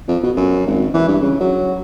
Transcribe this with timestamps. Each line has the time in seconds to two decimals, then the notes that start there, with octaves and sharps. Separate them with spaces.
0.08 F2
0.23 B2
0.36 F#2
0.66 G#1
0.94 E3
1.08 G2
1.21 C#3
1.40 F#3